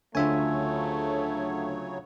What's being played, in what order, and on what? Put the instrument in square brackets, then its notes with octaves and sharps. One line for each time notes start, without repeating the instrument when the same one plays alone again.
[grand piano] D2 [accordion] C#3 F#3 C#5 [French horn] A3 [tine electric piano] F4 E5 G#5